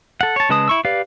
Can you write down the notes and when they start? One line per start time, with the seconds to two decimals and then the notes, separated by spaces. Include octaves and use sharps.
0.21 A4 F#5
0.36 C#5 A5
0.49 C#3 G#3 B4 A5 D#6
0.68 E4 C#6 E6
0.85 G4 B4 D5 F5